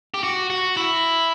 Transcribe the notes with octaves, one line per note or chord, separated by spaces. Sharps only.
G4
F#4
F#4
E4